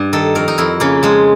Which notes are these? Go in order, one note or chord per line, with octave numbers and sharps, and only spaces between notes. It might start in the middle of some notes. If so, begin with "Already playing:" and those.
Already playing: G2
D#3 A4
F2 A#4
D#4
F2 E4
C#3 A#3
F3 G#3